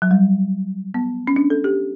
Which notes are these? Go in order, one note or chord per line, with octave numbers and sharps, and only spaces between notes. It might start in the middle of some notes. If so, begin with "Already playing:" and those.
F#3
G3
B3
C#4
D4
A4
G4